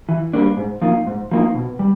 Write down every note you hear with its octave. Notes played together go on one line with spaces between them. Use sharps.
E3
G3 A#3 D4
G#2
F3 A#3 D#4
G#2
F3 A#3 D#4
B2
G3